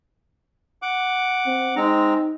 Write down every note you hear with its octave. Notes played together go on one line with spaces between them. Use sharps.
F#5 D6
C4
G#3 C4 D#4 A#5